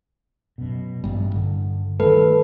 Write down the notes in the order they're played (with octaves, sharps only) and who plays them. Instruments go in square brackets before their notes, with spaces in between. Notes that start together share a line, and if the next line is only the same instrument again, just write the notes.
[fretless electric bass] F#2 B2
[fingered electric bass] A1 G3 [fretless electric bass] G2 A#3
[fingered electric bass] D3
[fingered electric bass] D#3 G3 A3 [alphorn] A4 [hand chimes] B4